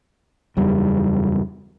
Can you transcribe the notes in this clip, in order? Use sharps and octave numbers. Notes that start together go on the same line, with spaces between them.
F#1 E2 G3